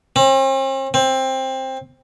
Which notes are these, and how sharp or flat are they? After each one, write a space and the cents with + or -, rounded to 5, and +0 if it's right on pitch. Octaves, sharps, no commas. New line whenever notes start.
C4 +45
C4 +15